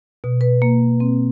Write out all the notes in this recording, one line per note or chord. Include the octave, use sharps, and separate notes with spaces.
B2
B4
A#3
C4